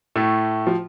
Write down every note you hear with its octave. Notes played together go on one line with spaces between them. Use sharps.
A2 A3
F3